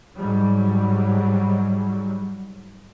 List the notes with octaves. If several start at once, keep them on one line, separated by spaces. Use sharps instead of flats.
G#2 F#3 G3